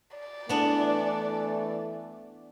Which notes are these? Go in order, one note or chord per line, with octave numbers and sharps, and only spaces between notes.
D5
E3 A3 B3 D4